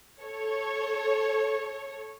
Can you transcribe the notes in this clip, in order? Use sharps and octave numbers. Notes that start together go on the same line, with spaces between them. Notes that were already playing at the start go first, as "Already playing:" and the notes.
A4 C#5